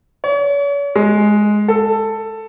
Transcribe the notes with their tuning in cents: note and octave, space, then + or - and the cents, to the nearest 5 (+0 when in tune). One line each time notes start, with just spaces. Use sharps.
C#5 +40
G#3 +10
A4 +10